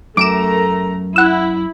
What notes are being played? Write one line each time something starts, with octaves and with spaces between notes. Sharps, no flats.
F#2 A3 A#4 A#5 D6 D7 E7
E4 F#5 E6